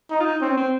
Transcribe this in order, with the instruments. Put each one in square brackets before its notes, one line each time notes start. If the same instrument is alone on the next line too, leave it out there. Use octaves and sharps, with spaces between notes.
[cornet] D#4
[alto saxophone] F4
D#4
[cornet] C4 [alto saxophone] C#4
[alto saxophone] C4